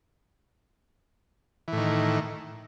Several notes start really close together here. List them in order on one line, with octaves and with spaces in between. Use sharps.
E3 A2 D#3